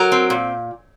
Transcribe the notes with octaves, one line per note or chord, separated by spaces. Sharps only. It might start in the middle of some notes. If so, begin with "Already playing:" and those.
Already playing: F#3 A#4
C4
A#2